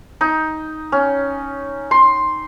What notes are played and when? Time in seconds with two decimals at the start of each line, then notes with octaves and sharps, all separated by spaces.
0.21 D#4
0.92 C#4
1.91 C6